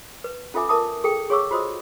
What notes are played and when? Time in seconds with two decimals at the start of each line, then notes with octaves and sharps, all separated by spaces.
0.24 B4
0.54 C#4 F4 A4 E5 G#5 D6
0.69 A#4 B4 E5 A5 D6 D#6
1.04 G#4 A4 G5
1.30 G#4 C#5 F5 C#6 D6 E6
1.51 F4 F#4 C5 D#5 D#6 E6